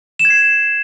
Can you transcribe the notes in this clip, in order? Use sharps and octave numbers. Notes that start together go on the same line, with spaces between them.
E7
G#6
C7